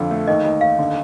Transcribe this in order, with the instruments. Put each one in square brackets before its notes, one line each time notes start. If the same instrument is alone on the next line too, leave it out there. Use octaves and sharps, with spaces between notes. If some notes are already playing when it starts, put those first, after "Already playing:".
Already playing: [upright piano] F2 D3 [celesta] F5
[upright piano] A3
[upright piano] D#2 [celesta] D#5
[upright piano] D#2 [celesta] D#5
[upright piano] D#2 [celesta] F5
[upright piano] D3